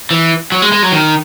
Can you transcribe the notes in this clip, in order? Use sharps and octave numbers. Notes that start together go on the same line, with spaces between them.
E3
F#3
G#3
G#3
F#3
D#3